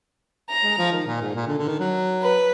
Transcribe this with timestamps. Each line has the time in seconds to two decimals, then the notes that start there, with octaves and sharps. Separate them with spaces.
0.49 A#5
0.64 G#3
0.78 F3
0.93 D#3
1.07 A#2
1.22 G#2
1.36 A#2
1.47 D3
1.58 D3
1.68 D#3
1.80 F#3
2.23 B4